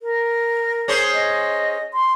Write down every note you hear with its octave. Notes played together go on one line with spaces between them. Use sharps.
A#4
C#4 G#4 C5
D#5
C6